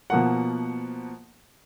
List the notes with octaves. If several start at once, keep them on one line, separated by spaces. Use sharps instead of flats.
B2 F3 A#3 F#5